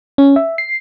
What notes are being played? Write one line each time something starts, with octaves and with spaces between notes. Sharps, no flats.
C#4
E5
C7